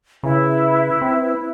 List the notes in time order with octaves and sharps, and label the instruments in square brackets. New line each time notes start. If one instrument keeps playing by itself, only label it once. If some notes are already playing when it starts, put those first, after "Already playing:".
[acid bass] C#3 [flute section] E4 B4
[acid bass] C4